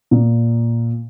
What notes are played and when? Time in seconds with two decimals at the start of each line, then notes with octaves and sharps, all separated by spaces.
0.11 A#2